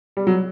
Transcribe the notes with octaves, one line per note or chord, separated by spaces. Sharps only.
G3
F#3